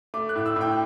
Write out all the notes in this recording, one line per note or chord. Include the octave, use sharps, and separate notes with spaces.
A3 D6
F#6
A2
E6
A2 G5